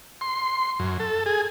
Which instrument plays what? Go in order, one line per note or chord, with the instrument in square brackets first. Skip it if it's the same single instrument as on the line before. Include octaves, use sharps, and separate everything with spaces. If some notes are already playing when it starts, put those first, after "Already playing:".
[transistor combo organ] C6
F#2
A4
G#4